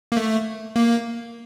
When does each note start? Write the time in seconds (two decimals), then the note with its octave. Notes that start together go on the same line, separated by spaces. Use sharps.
0.12 A#3
0.17 A3
0.76 A#3